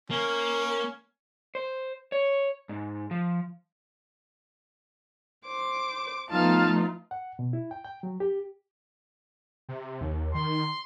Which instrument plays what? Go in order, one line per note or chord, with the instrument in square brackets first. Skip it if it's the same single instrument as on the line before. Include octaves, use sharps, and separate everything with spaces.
[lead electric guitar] A#3 [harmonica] C#4
[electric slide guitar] C5
C#5
G#2
F3
[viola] C5 [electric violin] D6
[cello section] F3 A3 B3 [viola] D#4 F4 [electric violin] F5 A5
[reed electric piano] F#5
B2
E4
G5
G5
F#3
G4
[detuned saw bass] C3
D#2
[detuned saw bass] D#3 [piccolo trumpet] C6